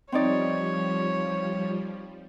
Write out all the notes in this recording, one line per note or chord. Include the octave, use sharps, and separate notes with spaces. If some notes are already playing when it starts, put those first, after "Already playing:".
F3 G3 C4 D#4 C#5 D5